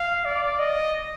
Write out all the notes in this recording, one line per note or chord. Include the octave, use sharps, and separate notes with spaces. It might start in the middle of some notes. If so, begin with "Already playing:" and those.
Already playing: F5
D5
D#5